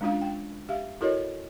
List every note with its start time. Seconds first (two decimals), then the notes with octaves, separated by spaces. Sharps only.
0.01 G#3 C#4 D4 F4 F5
0.21 G5
0.69 G4 E5 F5
1.01 E4 F#4 A4 A#4 C#5 D#5